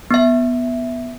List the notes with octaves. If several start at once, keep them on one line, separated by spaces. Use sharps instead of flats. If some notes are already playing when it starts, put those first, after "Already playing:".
B3 E5